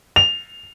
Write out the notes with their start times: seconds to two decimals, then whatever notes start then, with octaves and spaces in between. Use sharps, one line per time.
0.16 F7